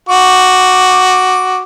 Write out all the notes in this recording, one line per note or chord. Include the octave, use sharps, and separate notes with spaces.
F#4 D6